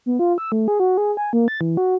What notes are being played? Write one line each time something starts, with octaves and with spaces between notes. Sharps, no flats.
B3
F4
E6
A3
G#4
F#4
G#4
G#5
A#3
A6
E3
F#4